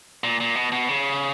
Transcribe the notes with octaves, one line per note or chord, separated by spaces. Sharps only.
A#2
A#2
B2
B2
C#3